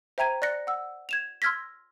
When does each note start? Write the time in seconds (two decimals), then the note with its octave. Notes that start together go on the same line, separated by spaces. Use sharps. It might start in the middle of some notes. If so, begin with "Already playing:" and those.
0.18 C5 E5 G5 A#5 G#6 D#7
0.42 D5 F#6 A#6 C#7
0.67 F#5 E6
1.09 G#6 E7 F7
1.42 C6 E6 F6 G#6 A#6 B6